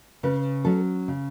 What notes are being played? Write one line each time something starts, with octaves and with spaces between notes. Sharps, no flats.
C#3 B4
F#3 C#4 A4
C#3